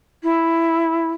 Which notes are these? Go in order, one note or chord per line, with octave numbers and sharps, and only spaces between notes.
E4